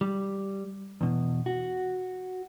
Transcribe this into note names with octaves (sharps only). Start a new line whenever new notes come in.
G3
E2 B2
F#4